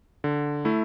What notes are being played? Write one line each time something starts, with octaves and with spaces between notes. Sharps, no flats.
D3
A3 E4